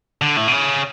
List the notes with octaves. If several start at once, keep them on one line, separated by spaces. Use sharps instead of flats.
D3
A2
B2
C#3